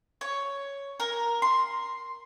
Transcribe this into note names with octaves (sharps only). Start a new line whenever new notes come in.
C#5
A#4
C6